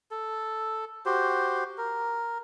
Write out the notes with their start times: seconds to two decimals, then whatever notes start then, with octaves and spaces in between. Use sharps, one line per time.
0.11 A4
1.06 F#4 G4 C5
1.78 A#4